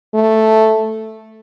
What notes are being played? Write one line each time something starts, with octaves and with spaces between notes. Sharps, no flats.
A3